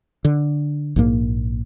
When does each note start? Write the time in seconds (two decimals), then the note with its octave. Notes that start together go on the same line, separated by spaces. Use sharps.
0.25 D3
0.96 A#1 G#2 A#3